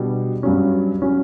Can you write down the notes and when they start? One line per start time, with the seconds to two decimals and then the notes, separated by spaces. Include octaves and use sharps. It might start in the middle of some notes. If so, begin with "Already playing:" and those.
Already playing: B2 G3 D4 G4
0.43 G2 F#3 C#4
1.02 F#3 C#4